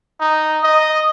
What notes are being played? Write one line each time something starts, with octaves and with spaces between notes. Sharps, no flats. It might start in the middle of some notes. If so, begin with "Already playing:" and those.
D#4
D#5